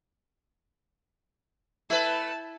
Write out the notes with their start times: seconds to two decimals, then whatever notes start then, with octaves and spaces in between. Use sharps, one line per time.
1.90 A3 E4 B4 A5